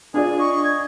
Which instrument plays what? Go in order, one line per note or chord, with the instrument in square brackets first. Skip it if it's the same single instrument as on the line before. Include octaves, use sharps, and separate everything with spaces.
[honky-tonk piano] D4 F4 D5 [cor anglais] G#4
[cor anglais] D#5 [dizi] C#6
[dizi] G#6